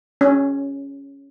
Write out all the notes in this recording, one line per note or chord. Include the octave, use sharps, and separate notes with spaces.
C#4